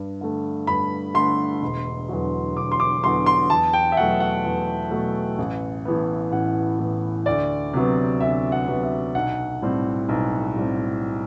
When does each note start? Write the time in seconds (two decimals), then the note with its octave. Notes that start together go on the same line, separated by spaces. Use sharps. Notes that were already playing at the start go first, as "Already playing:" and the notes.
Already playing: G2
0.21 D3 A3
0.67 G2 B5
1.14 D3 A3 C6
1.62 E1
2.09 E2 D3 F#3
2.56 E1 D6
2.72 C6
2.80 D6
3.03 E2 D3 F#3 C6
3.26 C6
3.50 E2 A5
3.73 G5
3.92 E5
3.97 B2 F#3 A3 F#5
4.20 F#5
4.45 E2
4.91 B2 F#3 A3
5.38 A1
5.85 A2 E3 B3
6.32 A1 F#5
6.79 A2 E3 B3
7.26 D2 D5
7.73 C3 F#3 B3
8.20 D2 E5
8.52 F#5
8.67 C3 F#3 B3
8.83 E5
9.15 B1 F#5
9.62 A2 G3 C4
10.09 B1
10.56 A2 G3 C4